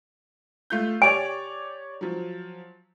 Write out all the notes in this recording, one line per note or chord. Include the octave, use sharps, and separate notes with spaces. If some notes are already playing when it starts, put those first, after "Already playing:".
A3 F4 G6
G4 C#5 D5 G#5
F3 F#3